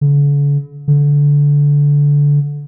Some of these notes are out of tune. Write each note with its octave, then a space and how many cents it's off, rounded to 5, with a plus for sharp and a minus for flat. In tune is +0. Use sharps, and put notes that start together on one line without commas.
D3 -45
D3 -20